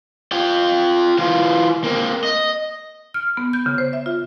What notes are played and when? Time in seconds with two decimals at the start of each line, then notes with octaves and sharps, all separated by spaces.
0.32 F4 G5
1.19 E3 F4
1.84 A#3 C4
2.24 D#5
3.14 F6
3.37 B3
3.53 G6
3.66 C#3
3.78 C5
3.93 E5
4.06 F4